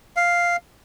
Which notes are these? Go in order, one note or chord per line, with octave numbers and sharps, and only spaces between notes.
F5